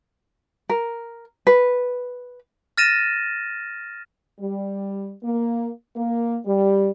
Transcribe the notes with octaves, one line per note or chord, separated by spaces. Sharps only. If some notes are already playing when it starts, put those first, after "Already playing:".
A#4
B4
F6 A6 A#6 D#7 E7
G3
A#3
A#3
G3